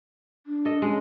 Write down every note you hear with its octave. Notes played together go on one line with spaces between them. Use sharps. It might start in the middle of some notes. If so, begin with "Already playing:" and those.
D4
A4 D#5
G#3 C#4